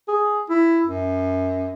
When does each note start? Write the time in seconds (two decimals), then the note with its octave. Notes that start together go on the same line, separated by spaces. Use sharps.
0.08 G#4
0.50 E4
0.87 F#2